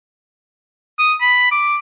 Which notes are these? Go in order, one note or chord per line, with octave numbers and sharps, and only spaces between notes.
D#6
B5
D6